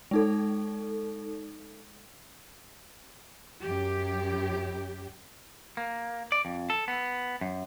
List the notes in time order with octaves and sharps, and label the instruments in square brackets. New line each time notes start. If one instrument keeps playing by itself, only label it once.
[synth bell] G#3 D#4 A4
[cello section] F#2 G4
[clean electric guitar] A#3
D5
F2
A4
B3
F#2